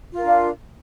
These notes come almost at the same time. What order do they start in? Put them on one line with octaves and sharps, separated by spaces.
F4 A#4 D4 F5